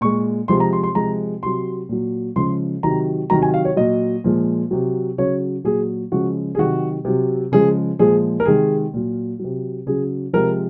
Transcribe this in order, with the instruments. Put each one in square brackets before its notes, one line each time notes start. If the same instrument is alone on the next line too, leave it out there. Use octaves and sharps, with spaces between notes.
[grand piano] A#2 G#3 C#6
C3 F3 G#3 C6
A#5
C6
C6
C3 F3 G#3 A#5
C3 F#3 C6
A#2 F#3
C#3 F3 G#3 C6
C3 D#3 F#3 A#5
C3 D#3 F#3 A#5
G#5
F5
C#5
A#2 F#3 D#5
A#2 F3 G#3
C3 F#3
C#3 F#3 C#5
A#2 F#3 G#4
C#3 F3 G#3 F#4
G#4
C3 D#3 F#3 F#4
C3 F#3
C#3 F3 G#3 G#4
A#2 F3 G#3 G#4
A#4
C3 D#3 G#3 G#4
A#2 F#3
C3 F#3
C#3 F#3 G#4
C3 F3 G#3 A#4